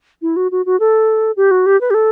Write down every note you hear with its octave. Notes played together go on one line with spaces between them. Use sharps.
E4
F#4
F#4
F#4
A4
G4
F#4
G4
B4
G4
A4